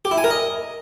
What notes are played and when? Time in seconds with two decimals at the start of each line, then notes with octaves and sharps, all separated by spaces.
0.05 G4
0.11 E4
0.18 G#5
0.24 A#4
0.30 D#5